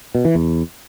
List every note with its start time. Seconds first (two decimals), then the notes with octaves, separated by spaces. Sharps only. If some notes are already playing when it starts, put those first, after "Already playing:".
0.15 B2
0.25 E3
0.35 E2